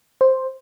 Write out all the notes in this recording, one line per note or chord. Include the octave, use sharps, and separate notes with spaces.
C5